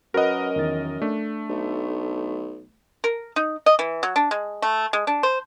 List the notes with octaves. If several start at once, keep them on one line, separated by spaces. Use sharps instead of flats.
F#2 F#4 A#4 B4 D#5 F#5
E2 D#3 A6
A3 D4
B1
A#4
D#4
D#5
E3
F#3
D4
G#3
A3
G#3
D4
C5